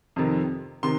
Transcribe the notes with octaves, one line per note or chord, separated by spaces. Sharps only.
F2 C3 D#3
C3 D#3 C6